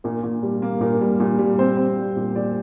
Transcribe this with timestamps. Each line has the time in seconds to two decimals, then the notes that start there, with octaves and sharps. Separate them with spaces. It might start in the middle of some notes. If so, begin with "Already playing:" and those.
0.04 A#2 A#4
0.23 A#2
0.43 G3
0.62 A#3
0.81 A#2 A#4
1.01 G3
1.20 A#2
1.39 G3
1.59 C4 C5
1.77 C4
1.97 G3
2.17 A#2
2.35 A#2 D5